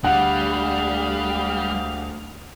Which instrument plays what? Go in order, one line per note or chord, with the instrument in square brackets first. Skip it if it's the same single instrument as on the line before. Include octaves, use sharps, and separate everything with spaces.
[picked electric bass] D2 D3 [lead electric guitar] G3 [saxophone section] G4 G#4 F5 [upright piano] F#5